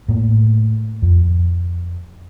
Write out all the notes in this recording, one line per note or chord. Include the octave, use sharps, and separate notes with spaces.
A2 A#3
F2